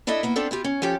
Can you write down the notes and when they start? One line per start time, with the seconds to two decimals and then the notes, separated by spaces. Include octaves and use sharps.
0.07 D4 E4 A4 D#5 E5
0.23 A#3 B3 E4
0.36 B3 C4 D4 A4 F5
0.51 E4 F4 G4
0.64 C#4
0.82 F3 C#4 G4 A4